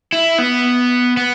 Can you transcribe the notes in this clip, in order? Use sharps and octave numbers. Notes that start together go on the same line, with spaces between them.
E4
B3
B3